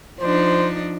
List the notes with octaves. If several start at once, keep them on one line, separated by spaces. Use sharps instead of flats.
F3 D4 D#4 C5